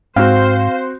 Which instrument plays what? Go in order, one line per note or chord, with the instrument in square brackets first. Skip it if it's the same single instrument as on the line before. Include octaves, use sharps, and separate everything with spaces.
[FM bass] G#2 [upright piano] C4 F#4 [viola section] C5 [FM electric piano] F5